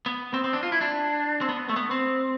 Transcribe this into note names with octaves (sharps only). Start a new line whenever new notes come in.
B3
C4
C4
D4
F4
E4
D4
C4
B3
A3
B3
C4